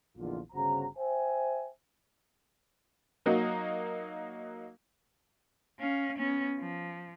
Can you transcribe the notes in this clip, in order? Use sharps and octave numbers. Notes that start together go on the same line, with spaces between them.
A#1 E2 D3 D#3 F4
G1 C#3 F#4 C5 A#5
C5 E5 G5 G#5
F#3 A#3 D#4 F#4
C#4 F5
B3 C#4
F3